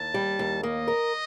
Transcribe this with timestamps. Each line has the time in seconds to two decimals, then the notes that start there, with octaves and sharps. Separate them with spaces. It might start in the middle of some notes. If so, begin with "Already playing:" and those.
Already playing: D#2 A5
0.14 G3
0.39 D#2
0.63 A#3 D#5
0.88 A#4